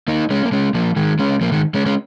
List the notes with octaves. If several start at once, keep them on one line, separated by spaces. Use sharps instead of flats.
A#3 D#4
G#3 C#4
A#3
G#3 C#4
F3 A#3
D#3 G#3
G#3 C#4
F3 A#3
D#3 G#3
G#3 C#4
G#3 C#4